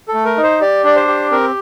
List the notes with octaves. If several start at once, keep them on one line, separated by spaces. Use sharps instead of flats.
A4
A3
A#4
D#4
C5
G4 D5
D4 D5
C5
G4
C4 A#4